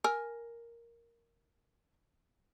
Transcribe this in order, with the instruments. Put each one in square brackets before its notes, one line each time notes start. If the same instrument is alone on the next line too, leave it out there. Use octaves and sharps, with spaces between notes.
[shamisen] A#4 G#5